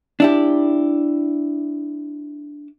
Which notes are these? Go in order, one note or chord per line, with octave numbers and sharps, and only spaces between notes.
D4 E4 G4